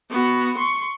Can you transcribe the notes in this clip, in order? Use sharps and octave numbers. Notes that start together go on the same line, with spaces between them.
B3 F#4
C6 C#6